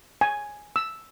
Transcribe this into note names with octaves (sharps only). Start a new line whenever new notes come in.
G#5
E6